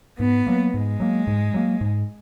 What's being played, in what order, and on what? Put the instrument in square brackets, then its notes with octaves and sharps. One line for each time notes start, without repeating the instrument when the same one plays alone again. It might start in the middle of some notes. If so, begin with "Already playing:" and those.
[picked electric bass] G#2 [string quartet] B3
[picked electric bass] F#3 A#3
[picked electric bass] G#2 [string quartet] G#3
[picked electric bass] F#3 A#3
G#2
F#3 A#3
G#2